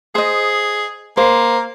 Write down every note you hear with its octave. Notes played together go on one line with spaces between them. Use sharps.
G#4 C5 D#5
A#3 C5